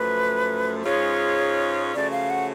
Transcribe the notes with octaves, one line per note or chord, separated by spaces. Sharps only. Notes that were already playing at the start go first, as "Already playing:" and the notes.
Already playing: F#2 F3 A3 B4
G#2 G#3 C#4 F4 G#4 C#5
C#3 F3 A3 C#4 F#4 D5
F5
F#5